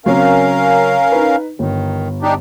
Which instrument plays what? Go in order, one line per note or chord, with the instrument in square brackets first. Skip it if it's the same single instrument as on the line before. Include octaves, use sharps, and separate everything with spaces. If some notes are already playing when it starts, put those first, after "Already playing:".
[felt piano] C#3 F#3 C4 [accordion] C#4 A#4 F5
[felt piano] D#4 B4
[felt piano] G1 [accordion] D#3
[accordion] D4 D#4 G4